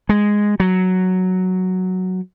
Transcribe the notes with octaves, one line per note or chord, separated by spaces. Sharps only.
G#3
F#3